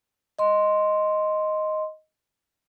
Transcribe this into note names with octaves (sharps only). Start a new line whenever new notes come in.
D#5 C6